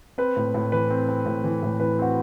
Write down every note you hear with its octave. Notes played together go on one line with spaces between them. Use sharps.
C4 B4
A2
A2
E3 B4
C4
C4
A2
E3
A2
E3 B4
C4 F#4